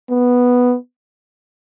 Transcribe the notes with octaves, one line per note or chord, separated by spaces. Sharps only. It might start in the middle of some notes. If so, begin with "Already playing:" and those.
B3